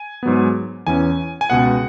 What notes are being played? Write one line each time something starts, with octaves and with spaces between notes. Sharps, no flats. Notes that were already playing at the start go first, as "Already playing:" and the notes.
Already playing: G#5
G#2 F#3 B3
E2 E3 C#4 G#5
G#5
C#2 B2 B3 F#5